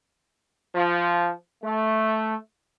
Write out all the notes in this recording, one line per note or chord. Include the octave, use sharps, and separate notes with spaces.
F3
A3